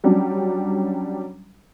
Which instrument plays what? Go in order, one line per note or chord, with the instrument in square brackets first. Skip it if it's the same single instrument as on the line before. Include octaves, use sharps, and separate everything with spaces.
[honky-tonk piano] F#3 G3 C#4 D4